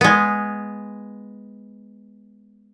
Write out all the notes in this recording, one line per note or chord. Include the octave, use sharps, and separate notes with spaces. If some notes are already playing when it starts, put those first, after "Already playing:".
G#3 B3